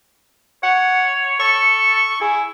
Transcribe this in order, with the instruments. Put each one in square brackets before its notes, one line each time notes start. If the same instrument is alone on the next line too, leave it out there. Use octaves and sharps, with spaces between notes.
[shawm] C#5 [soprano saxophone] F#5
[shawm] A4 [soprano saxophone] C#6
[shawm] E4 [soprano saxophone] G#4